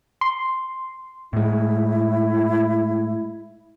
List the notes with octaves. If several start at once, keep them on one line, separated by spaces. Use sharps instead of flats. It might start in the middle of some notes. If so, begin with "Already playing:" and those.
C6
A2 G#3 E4